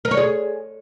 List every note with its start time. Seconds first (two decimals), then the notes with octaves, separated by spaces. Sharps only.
0.05 A#4
0.11 C#5
0.17 G#4